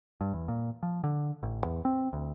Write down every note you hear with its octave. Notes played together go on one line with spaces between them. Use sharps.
G2
E2
A#2
F3
D3
A1
E2
C4
D2